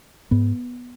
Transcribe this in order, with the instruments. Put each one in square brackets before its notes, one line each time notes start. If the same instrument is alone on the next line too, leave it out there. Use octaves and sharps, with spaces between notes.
[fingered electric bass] G#2 B3